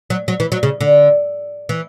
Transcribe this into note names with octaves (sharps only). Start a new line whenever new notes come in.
F#3
F#3
E3
F#3
C#3
D3
E3